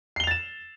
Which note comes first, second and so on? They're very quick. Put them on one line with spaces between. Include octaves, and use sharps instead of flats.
C7 G7 F7 A6 E7